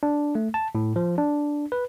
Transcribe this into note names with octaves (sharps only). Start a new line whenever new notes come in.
D4
A3
A5
A2
F3
D4
B4